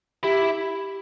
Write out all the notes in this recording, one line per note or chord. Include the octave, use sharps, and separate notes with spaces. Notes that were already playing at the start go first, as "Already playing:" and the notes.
E4 G4